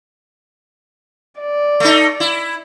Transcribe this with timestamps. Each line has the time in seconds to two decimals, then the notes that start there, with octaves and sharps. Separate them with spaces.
1.41 D5
1.80 A3 D#4
2.20 E4